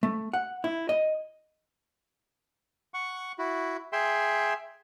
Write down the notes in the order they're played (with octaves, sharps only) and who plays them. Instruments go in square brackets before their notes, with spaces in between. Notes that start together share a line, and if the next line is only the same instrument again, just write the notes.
[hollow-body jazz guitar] A3
F#5
E4
D#5
[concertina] F#5 C#6
E4 F#4
G#4 E5 G5 C6